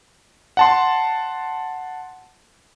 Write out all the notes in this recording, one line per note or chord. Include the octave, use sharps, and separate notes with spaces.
F#5 A5 C6